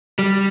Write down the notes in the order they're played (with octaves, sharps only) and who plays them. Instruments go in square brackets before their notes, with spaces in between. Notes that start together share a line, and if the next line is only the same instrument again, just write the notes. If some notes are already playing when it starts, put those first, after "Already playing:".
[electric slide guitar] G3